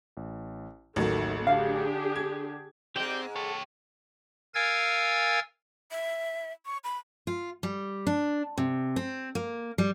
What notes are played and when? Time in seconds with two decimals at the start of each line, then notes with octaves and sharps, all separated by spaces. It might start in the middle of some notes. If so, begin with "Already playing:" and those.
0.17 A1
0.96 A1 D#2 D#3 F#3 A3
1.47 D3 D4 G4 G#4 F5
2.16 G#6
2.96 G#2 G#3 C4 G4 D5 G5
3.36 G4 A4 C#5
4.54 A#4 F5 G#5 E6 G#6 A6
5.91 E5
6.66 C#6
6.84 B5
7.27 F4
7.63 G3
8.07 D4
8.58 C3
8.96 C4
9.35 A#3
9.78 G3